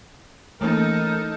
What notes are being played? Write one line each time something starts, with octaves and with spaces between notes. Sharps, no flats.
E3 A3 A#3 C#4 D#4 A4 A#4